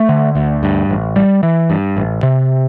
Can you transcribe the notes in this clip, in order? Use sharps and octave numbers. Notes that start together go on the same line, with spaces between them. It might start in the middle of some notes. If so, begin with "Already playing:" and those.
Already playing: A3
D3
D2
G2
A1
G3
E3
G2
A1
C3